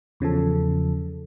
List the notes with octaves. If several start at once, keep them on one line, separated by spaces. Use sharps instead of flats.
E2 C#3 F3 A4